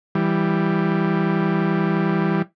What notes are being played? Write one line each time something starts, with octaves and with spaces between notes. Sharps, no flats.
E3 G3